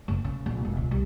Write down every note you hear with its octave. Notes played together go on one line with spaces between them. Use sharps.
F#1
C#3
A#1
E1
C#2
C2